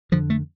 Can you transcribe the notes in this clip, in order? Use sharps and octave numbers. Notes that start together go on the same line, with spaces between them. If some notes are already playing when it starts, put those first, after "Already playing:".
F2 D3 F3
A3